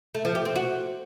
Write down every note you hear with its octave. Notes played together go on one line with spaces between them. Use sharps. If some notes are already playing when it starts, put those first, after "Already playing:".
A3
F3
G4
C4
F#4